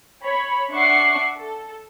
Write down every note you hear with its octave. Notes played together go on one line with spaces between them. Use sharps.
C#5 B5
D4 E5 F#5 C#6 D6 C7
A4